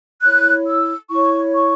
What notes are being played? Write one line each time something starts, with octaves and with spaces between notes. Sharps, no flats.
E4 C#5 F#6
E6
E4 C#5 C#6
C#6